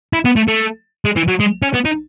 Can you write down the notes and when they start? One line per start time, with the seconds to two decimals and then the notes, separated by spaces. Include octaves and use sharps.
0.13 E4
0.25 B3
0.36 A3
0.48 A3
1.05 G#3
1.16 E3
1.28 F#3
1.40 G#3
1.62 C#4
1.74 B3
1.85 D#4